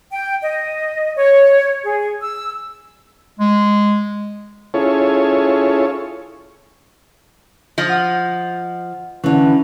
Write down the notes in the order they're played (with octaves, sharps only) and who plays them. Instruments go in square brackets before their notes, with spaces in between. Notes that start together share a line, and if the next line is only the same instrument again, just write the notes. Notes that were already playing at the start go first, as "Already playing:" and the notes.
[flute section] G5
D#5
C#5
G#4
E6
[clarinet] G#3
[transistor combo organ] C#4 E4 F4 G#4 A4 C#5
[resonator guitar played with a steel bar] F3 D#5
[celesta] F#5
[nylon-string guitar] D3 E3 [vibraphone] C#4